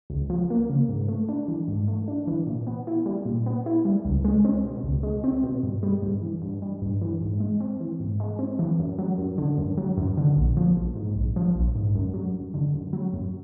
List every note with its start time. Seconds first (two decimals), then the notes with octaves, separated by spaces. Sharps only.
0.10 C#2
0.30 F3
0.50 A#3
0.69 C#3
0.89 G#2
1.08 A3
1.29 D4
1.48 E3
1.68 G#2
1.88 A3
2.08 D4
2.27 E3
2.47 A#2
2.67 B3
2.87 E4
3.06 G3
3.25 A#2
3.46 B3
3.66 E4
3.85 G3
4.05 C#2
4.25 G#3
4.45 C4
4.65 B2
4.84 C#2
5.03 G#3
5.24 C4
5.43 B2
5.63 G2
5.83 G3
6.02 G2
6.22 E3
6.42 G2
6.62 G3
6.82 G2
7.02 E3
7.21 G#2
7.40 G#3
7.60 C4
7.80 E3
8.00 G#2
8.20 G#3
8.39 C4
8.59 E3
8.79 F#2
8.98 F#3
9.18 F#2
9.38 D3
9.58 F#2
9.77 F#3
9.97 F#2
10.17 D3
10.37 A#1
10.57 F3
10.77 A#1
10.96 G#2
11.15 A#1
11.36 F3
11.55 A#1
11.75 G#2
11.95 F#2
12.14 F#3
12.34 F#2
12.54 D3
12.74 F#2
12.93 F#3
13.13 F#2